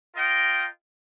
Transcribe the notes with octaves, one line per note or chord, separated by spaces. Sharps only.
F4 A#4 D#5 G5